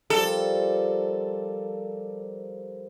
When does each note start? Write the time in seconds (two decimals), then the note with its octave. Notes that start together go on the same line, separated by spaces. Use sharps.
0.10 F3 G3 A4 A#4